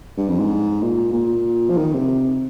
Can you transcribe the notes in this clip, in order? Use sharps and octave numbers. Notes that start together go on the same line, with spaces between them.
G2
F2
G#2
A#2
A#2
F3
D#3
C3